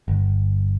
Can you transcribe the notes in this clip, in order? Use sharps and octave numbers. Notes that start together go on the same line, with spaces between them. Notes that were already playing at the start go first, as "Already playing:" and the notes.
G1